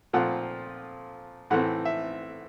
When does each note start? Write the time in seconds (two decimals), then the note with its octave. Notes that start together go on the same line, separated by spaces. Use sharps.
0.13 A#2 F3 A3 C4 F#5
1.50 A2 E3 A3 C4 F#5
1.85 E5